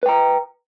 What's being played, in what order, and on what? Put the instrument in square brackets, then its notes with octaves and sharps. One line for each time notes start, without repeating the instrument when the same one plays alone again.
[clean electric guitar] B4
G5
A#5